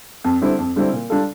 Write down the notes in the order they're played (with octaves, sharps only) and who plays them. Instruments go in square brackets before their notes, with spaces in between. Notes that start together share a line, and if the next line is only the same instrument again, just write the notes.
[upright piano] F2
D3 G3 C4 E4
F2
D3 G3 C4 E4
A#2
G3 D4 F4 A4